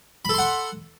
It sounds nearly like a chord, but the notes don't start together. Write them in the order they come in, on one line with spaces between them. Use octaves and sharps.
B5 A4 C6 F#5